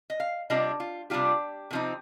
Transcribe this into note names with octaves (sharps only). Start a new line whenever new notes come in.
D#5
F5
C3 G3 D4 F4 D#5
F4
C3 G3 D4 F4 G4
C3 F3 C4 D#4